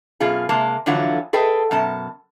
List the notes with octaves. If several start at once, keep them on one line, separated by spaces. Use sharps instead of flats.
F#2 B2 F4 G#4
C3 G#3 A#3 A5
F2 D3 E3 F#3 F4 F#4
G#4 A4 B4 D#5 G5
F#2 B2 A5